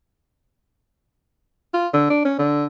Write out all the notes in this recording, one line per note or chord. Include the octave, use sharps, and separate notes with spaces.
F4
D3
D4
C#4
D3